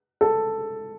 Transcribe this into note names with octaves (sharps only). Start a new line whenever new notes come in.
A4